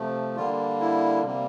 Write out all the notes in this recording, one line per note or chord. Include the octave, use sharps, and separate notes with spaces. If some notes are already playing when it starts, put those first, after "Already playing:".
Already playing: C3 F3 A3
D3 G3 A#3 F4
E4
C3 G3 A#3